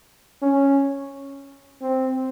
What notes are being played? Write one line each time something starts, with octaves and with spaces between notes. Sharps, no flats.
C#4
C4